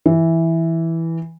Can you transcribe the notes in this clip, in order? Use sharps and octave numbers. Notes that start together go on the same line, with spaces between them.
E3